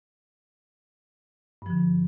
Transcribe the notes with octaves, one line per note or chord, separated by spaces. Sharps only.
G2 D3 F3